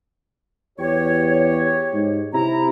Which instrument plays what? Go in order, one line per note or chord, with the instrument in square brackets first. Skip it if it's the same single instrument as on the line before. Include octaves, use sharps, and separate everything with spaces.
[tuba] E2 [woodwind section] G4 C#5
[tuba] G#2
[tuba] C3 [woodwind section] E4 A#5